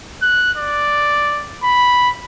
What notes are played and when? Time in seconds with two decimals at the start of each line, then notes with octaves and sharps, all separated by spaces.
0.23 F#6
0.57 D5
1.64 B5